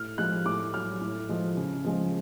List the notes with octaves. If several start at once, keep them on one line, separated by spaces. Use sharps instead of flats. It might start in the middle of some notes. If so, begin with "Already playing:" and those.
Already playing: A2 F6
F3 G#3 F#6
A2 D6
F#3 F6
A2
F3 G#3
C#3
F3 G#3